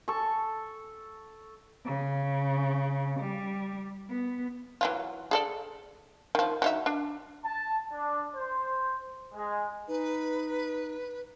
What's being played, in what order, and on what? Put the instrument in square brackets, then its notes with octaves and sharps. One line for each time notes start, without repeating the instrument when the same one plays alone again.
[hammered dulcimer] A4 C#6
[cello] C#3
G3
B3
[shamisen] E3 F#3 F4
G#4 A4 D5
D#3 F3
F#3 D#4 E5
D4
[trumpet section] A5
D4
C5
G#3
[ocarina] D#4 [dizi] B4